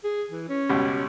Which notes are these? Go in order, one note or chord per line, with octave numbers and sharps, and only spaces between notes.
G#4
E3
C#4
C#2 B2 G3